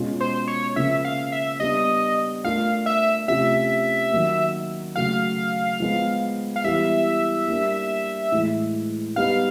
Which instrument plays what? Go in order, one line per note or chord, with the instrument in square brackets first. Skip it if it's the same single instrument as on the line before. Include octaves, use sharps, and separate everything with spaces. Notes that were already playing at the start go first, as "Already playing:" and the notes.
Already playing: [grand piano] B2 G#3 C#4 F4 G#4
[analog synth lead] C5
C#5
[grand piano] C#3 F3 A#3 C#4 [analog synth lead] E5
[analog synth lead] F5
E5
[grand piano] G3 B3 D4 [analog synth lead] D#5
[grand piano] A3 D4 F4 A#4 [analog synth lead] F5
[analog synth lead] E5
[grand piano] C3 F3 A3 C#4 F4 [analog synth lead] E5
[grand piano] D#3 F#3 A#3
[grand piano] C#3 F#3 A3 [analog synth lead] F5
[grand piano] F3 G#3 B3
[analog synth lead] F5
[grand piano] E3 G3 B3 [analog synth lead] E5
[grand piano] G3 A#3 D4
A2 E3 G#3
[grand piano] G3 B3 D#4 G4 B4 [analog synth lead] F5